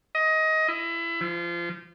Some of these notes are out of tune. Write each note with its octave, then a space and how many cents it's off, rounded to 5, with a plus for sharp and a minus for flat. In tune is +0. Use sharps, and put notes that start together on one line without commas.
D#5 +20
E4 +25
F3 -25